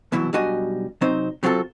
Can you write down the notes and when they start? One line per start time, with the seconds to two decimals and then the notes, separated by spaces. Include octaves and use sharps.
0.12 C2 B2 E3 F#3 E4
0.33 B1 G3 D4 F#4 D#5 G#5
1.01 C3 F#3 C4 D#4 C5
1.43 C3 F#3 C4 F4 F#4 A4